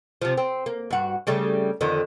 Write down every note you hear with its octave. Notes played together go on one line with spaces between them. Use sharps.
C3 F3
C4
A#3
G2 F#4
C#3 G3 A3
F2 D3 D#3